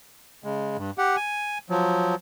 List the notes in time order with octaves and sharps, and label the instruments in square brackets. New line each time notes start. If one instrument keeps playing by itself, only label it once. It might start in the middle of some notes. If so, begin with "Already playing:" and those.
[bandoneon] C#3 G#3
G2
G4 F#5
G#5
F3 F#3